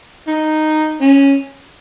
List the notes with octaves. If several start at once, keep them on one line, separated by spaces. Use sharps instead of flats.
D#4
C#4